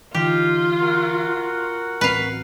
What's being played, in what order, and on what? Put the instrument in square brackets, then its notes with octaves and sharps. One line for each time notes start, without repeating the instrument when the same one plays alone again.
[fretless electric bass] D3 E3 [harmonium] D#4 [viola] F4 [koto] G4
[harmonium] F#4 A#4 F#5
[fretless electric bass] D1 A1 C4 [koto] B4 F5